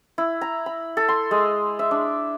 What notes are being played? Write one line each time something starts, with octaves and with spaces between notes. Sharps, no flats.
E4
A#5
B5
A4
C6
G#3
E5
D4